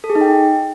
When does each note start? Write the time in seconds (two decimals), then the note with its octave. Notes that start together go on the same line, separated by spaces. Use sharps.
0.04 A4
0.10 G#4
0.15 D#4
0.21 G5